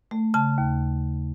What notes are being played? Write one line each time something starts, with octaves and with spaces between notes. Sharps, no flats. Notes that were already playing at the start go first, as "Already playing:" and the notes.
A3
C#3 A5
D#2